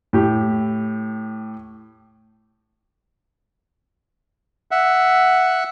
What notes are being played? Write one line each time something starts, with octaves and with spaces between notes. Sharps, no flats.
A2 G4
E5 F#5